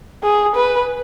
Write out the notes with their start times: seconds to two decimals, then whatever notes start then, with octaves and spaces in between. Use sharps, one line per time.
0.23 G#4
0.56 B4